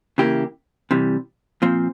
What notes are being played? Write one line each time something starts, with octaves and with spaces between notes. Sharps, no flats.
C#3 E3 A#3 E4 G4
C3 E3 G3
A#2 F3 C4